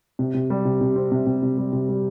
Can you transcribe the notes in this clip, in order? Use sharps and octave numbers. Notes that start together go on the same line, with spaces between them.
C3
C3
G3
C3
C3
C4
C3
C3
C3
G3
C3
G3